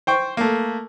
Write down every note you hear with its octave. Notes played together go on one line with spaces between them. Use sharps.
C5 G5 C#6
A3 A#3